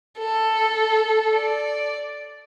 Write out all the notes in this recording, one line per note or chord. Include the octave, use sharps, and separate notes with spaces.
A4
D5